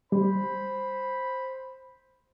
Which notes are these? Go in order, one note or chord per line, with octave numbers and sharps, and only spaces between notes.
G3 C5 B5